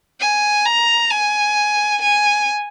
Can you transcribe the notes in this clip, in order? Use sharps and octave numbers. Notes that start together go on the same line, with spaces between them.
G#5
A#5
G#5
G#5